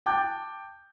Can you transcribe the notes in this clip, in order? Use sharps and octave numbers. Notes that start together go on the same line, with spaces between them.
G5 A5 D6 F#6 G6